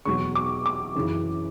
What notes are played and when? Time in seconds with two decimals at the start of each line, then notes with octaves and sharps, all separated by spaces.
0.05 E2 B2 F#3 C#6
0.35 D6
0.66 D6
0.95 F#2 C#3 E3